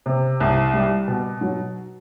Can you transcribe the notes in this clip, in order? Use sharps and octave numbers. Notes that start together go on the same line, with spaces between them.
C3
C2
G3
B2
F#3